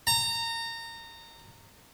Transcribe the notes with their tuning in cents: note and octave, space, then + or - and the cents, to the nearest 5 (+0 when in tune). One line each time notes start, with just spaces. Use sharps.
A#5 -25